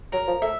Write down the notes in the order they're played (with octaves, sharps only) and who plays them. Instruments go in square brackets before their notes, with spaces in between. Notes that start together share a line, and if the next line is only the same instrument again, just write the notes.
[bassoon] F#3 [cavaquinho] A#4
[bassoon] F3
[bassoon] A3 [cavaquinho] E5